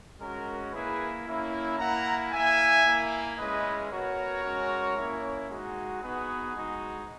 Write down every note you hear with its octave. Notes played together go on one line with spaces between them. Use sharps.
G#3 C#4 F#4 A#4
A#3 E4 G#4 B4
A#3 C#4 E4
A#3 E4 F#5 A#5
A#3 E4 E5 G#5
A#3 E4
G#3 C#4 E4 B4 D#5
B3 F#4 A#4 C#5
G#3 C#4 F#4
A#3 C#4 E4
G#3 D#4 F#4
B3 D#4 F#4 G#4 B4
G#3 D#4 F#4